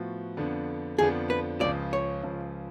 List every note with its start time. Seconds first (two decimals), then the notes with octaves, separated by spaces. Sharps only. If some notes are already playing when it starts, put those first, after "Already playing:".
Already playing: A2 F3 B3 F#4
0.37 F2 D3 F3 B3 D4
0.99 F2 D3 F3 B3 D4 G#4
1.30 B4
1.61 C#2 C#3 F3 D5
1.93 C#5
2.23 C#2 C#3 F3